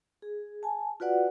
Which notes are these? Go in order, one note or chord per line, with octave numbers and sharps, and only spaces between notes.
G#4
G#5 A5
F4 F#4 B4 D5 F#5